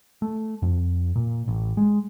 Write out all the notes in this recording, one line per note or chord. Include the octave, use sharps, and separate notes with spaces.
A3
F2
A#2
A1
G#3